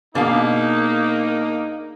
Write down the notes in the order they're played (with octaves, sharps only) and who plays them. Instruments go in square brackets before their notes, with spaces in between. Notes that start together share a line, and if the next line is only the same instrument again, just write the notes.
[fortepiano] B2 [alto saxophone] A#3 [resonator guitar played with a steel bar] D4 G#4 F5 [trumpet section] D#4